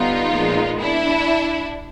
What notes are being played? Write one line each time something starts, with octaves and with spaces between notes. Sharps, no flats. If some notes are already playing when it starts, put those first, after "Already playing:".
Already playing: D3 G3 B3 D#4 F4
A#2 F3 G#3 B3
D4 E4